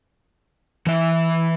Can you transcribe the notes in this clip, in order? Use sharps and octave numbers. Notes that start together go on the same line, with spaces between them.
E3 E5